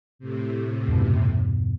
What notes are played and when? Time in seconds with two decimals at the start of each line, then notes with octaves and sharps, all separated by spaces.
0.19 A2 C3
0.88 E2 G2 B2